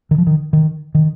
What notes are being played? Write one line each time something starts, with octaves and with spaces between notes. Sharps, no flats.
D#3
F3
D#3
D#3
D#3